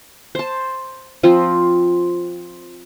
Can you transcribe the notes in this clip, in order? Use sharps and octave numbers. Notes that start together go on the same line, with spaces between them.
C5 A5
F3 C4 F4